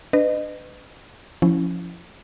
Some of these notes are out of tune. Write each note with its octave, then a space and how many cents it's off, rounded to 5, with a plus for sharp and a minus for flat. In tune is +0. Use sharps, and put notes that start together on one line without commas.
D4 +0 B4 +30 D#5 -30
F3 +0 C#4 +0 E4 +0